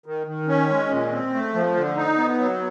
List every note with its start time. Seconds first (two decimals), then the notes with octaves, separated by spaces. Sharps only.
0.06 D#3
0.27 D#3
0.48 C#4
0.70 G#3
0.91 A#2
1.11 C4
1.33 A3
1.54 F3
1.76 D3
1.97 D#4
2.17 B3
2.39 F#3